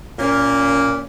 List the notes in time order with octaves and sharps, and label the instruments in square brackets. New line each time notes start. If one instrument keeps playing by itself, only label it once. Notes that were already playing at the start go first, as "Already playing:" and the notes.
[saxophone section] A#2 A#3 C#4